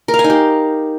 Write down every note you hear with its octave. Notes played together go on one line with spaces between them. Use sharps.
A#4
F5
G#5
D#4
G4